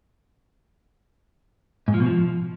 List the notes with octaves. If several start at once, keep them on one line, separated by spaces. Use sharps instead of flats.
G#2
F3
B2
F3